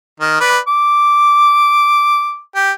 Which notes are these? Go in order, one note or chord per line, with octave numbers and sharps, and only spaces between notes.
D#3
B4 D5
D6
G4